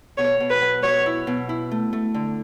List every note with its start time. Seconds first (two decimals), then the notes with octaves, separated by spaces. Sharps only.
0.18 B2 C#5
0.40 B2
0.50 B4
0.62 F#3
0.83 F#3 C#5
1.06 E4
1.27 B2
1.49 E4
1.71 A3
1.93 A3
2.14 D3